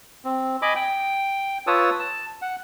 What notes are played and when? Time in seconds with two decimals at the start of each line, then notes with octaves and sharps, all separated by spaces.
0.25 C4
0.62 D#5 G#5 B5 D6
0.75 G5
1.67 F4 B4 C#5 A5 D#6 E6
1.99 A5
2.42 F#5